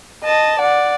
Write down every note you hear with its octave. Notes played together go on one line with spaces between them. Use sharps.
D#5 A5
D5 F#5